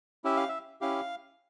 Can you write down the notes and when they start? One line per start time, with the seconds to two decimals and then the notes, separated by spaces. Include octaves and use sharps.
0.24 C#4 E4 G4 E5
0.37 F5
0.49 E5
0.81 C#4 E4 G4 F5